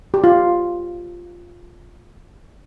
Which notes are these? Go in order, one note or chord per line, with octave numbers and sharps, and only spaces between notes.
G4
F4